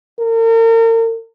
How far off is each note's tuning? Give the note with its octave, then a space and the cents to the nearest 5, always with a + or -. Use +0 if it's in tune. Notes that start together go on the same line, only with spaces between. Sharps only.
A#4 -40